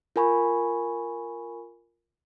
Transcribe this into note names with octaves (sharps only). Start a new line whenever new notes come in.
F4 A#4 G#5 B5 C#6